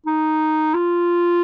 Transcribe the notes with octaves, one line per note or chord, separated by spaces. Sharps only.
D#4
F4